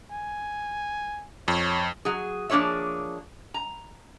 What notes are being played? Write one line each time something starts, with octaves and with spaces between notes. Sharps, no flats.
G#5
F2 C#5
F#3 G#4
F3 A#3 D4 G#4 C#5 E5
A#5